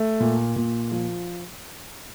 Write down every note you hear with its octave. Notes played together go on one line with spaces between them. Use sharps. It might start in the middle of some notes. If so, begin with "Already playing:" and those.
Already playing: A3
A#2
A#2
F3